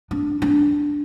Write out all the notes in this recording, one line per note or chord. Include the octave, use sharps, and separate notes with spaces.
D4
D4